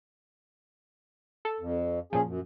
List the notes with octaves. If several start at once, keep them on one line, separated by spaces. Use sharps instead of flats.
A4
F2
A#2 F3 C#4 G#4
F#2